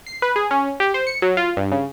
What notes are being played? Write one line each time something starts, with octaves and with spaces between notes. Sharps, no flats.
C7
B4
G#4
C#4
G4
C5
C#7
F#3
F4
G2
C#3